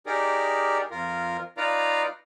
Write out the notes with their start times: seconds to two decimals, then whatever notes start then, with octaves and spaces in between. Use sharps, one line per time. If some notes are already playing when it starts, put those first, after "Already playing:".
0.06 D#4 G4 G#4 A#4 D5
0.91 F2 F4 A#4
1.57 D#4 F4 B4 D5 F5 A#5